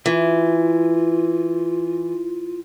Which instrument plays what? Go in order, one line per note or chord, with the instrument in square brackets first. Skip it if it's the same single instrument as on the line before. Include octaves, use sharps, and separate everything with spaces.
[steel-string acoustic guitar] E3 [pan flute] F4